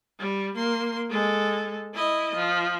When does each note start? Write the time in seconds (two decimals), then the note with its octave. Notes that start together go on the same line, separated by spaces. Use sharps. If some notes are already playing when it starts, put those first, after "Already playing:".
0.19 G3
0.56 A#3 C6
1.10 G#3 A4
1.94 E4 D#5
2.35 F3